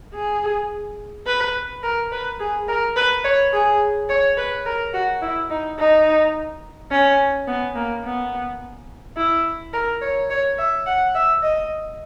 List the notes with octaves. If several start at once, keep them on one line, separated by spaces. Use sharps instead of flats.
G#4
B4
A#4
B4
G#4
A#4
B4
C#5
G#4
C#5
B4
A#4
F#4
E4
D#4
D#4
C#4
B3
A#3
B3
E4
A#4
C#5
C#5
E5
F#5
E5
D#5